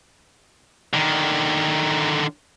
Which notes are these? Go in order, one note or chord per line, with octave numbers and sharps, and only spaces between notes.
D3 D#3